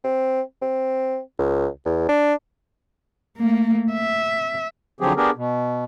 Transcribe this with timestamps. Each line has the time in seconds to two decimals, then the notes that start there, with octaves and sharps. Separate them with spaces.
0.04 C4
0.62 C4
1.39 C#2
1.85 E2
2.09 D4
3.38 A3 A#3
3.92 E5
5.01 D3 F3 F#3 C4 G4 G#4
5.17 B3 D4 G4 G#4 A#4
5.36 B2